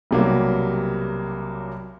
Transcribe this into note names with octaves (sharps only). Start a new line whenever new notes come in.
B1 C3 F#3 G3 A#3